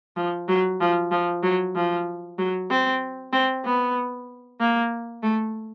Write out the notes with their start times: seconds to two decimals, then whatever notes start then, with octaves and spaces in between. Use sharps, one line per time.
0.16 F3
0.48 F#3
0.81 F3
1.11 F3
1.43 F#3
1.75 F3
2.39 F#3
2.70 C4
3.33 C4
3.65 B3
4.60 A#3
5.23 A3